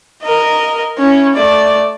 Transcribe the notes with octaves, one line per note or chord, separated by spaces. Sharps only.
A#4 D#5
C#4 E4
A3 D5